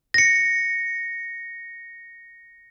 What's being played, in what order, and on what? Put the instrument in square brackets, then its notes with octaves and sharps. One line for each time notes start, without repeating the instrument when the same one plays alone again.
[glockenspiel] A#6 C#7